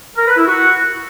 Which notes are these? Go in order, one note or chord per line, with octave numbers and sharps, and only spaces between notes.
A#4
B4
E4
F#4